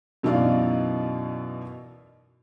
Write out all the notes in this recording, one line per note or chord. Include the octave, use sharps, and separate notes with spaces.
F#2 B2 E3 D#4 D5 F5